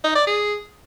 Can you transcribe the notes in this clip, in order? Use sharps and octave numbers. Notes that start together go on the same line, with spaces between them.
D#4
D5
G#4